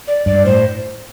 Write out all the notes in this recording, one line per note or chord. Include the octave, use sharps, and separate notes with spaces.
D5
G2 D5
A2 C5